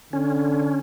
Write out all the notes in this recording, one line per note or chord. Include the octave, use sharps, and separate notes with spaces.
D3 C#4